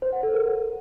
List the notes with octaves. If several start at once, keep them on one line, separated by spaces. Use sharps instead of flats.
C5
F#5
A4
A#4